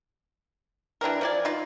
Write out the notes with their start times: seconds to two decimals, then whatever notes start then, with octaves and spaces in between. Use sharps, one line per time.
1.01 E3 D4 G4 A#4
1.21 F3 D5 G#5
1.45 D#4 F4